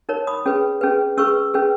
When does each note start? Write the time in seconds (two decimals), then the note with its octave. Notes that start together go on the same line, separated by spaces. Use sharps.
0.09 D#4 A#4 C#5
0.27 B5 D#6
0.46 C#4 G#4 B4
0.81 C#4 G#4 B4
1.17 C#4 G#4 B4 C#6 E6
1.54 C#4 G#4 B4